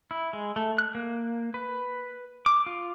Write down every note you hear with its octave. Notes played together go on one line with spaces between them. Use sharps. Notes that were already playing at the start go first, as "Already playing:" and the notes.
E4
G#3
A3
F#6
A#3
B4
D6
F4